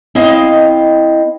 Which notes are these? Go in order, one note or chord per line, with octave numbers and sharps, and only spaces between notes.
C4 E4 D#5 F5